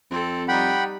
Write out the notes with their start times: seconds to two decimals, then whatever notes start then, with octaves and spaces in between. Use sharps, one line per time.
0.11 F2 C4 A4
0.48 G3 D#4 F#5 G5 B5